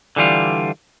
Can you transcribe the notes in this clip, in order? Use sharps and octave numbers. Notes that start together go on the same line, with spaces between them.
D3 E3 G3 F4